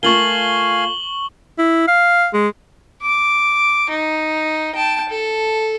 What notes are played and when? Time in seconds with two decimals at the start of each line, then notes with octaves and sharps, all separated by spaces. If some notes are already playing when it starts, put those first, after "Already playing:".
0.03 A3 F4 A#4 F5 G#5 C#6 F#7 G7
1.58 E4
1.88 F5
2.34 G#3
3.02 D6
3.90 D#4
4.75 G5 A5
5.09 A4